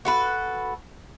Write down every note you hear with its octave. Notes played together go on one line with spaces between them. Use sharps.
F#4 A4 B4